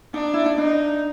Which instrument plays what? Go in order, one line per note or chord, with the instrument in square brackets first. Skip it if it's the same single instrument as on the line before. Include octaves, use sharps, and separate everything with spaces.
[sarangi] D4 [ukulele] D#4
[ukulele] E4
D#4
[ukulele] D4 [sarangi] D#4